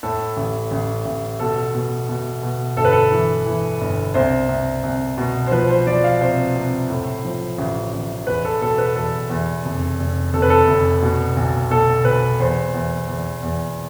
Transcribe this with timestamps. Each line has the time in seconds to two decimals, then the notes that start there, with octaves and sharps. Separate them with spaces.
0.03 A2 A4
0.37 A1
0.71 A1
1.05 A1
1.40 B2 A4
1.75 B2
2.09 B2
2.43 B2
2.77 G1 A4
2.85 B4
2.92 A4
3.12 E3
3.46 E3
3.81 G1
4.14 C2 C5
4.49 C2
4.83 C2
5.18 B2
5.47 C5
5.52 F3 B4
5.70 C5
5.87 F3 D5
6.04 F5
6.21 C3 C5
6.55 C3
6.90 A2
7.25 F3
7.58 A1
7.93 A1
8.26 E2 B4
8.45 A4
8.61 B2 A4
8.78 B4
8.95 E2 A4
9.30 E2
9.65 F1
9.99 F1
10.33 F1 A4
10.42 B4
10.50 A4
10.67 F1
11.02 B2
11.37 B1
11.70 B2 A4
12.05 B1 B4
12.40 E2 C5
12.74 E2
13.08 E2
13.43 E2